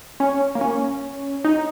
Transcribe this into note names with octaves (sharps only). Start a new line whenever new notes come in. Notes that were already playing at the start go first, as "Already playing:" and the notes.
C#4
A#3
C#4
D#4